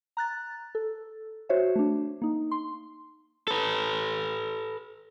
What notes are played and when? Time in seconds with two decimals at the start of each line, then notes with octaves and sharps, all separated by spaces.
0.17 A#5 F#6 A6
0.75 A4
1.49 F#4 C5 C#5 E5
1.76 A3 D4
2.22 A#3 D#4
2.51 C6
3.48 A4 B4